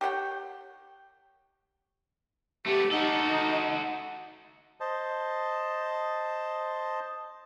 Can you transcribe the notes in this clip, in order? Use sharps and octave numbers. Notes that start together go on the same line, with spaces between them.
G4 C#5 F#5 G5
A3 B3 G4
D#4 F#4 A4
C5 D#5 A5